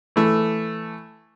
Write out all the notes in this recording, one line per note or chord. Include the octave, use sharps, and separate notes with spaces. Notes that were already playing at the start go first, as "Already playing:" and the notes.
E3 A3